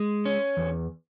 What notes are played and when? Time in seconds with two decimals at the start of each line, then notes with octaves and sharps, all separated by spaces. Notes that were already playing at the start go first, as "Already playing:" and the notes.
Already playing: G#3
0.26 C#4
0.57 E2